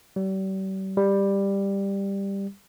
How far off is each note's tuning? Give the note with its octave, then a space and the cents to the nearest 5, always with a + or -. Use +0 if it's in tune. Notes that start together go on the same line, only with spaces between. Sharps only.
G3 -40
G3 +10